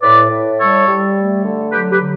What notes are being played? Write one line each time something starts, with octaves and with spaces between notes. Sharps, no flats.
A2 B4 D5
A2
G3 A4 C#5
G3
A3
D3
F#3 G4 B4
G4 B4
D3